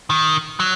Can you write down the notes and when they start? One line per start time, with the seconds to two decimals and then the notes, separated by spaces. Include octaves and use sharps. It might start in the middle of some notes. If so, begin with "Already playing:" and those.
0.10 D#3
0.60 F#3